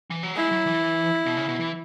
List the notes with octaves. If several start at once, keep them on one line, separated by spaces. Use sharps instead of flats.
E3
F#3
G#3 E4
F#3
E3
B2
C#3
B2
E3